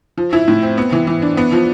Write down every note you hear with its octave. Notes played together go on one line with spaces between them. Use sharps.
F3
E4
A2
C4
B3
E3
E3
D4
B3
F3